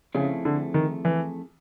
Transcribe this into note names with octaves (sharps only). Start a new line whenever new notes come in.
C#3 F3 A3 C4 E4 G#4
D3
D#3
E3